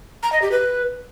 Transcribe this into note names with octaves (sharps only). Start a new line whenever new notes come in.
A#5
D#5
G4
B4